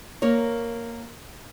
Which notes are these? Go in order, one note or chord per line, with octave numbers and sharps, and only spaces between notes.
A#3 A#4 C#5